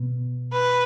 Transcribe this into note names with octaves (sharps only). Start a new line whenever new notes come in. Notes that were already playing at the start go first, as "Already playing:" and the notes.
Already playing: B2
B4